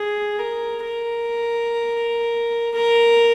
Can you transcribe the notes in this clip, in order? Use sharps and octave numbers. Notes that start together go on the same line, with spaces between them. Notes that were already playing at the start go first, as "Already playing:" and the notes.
Already playing: G#4
A#4
A#4
A#4